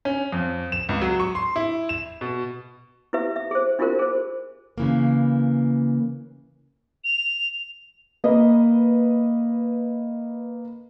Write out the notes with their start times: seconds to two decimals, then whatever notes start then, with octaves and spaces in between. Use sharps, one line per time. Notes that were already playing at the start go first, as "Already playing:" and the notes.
0.05 C#4
0.32 F2
0.72 E7
0.89 C#2
1.01 F#3
1.20 C#6
1.35 C6
1.56 E4
1.89 E7
2.21 B2
3.13 E4 G4 B4 E5
3.36 E5
3.51 G#4 C5
3.79 D4 E4 F4 G4 A#4 C5
3.99 G#4 C5
4.78 C#3 E3 A#3
7.04 F7
8.24 A#3 B4 D#5